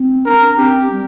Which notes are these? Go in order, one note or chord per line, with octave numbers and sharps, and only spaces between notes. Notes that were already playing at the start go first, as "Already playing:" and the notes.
Already playing: C4
D4 A#4
C4 G4
G3